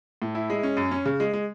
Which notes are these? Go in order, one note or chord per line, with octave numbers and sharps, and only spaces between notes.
A2
E4
G#3
C#4
F#2
C#4
C#3
G#3
G#3